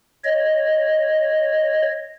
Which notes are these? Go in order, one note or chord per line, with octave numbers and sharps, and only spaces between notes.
C#5 D#5